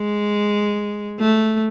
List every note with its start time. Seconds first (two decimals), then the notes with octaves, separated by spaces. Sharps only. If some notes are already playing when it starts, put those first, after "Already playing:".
Already playing: G#3
1.20 A3